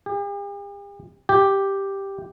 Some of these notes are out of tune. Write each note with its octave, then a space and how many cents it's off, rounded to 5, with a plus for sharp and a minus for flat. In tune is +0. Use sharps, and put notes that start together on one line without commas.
G4 +45
G4 +0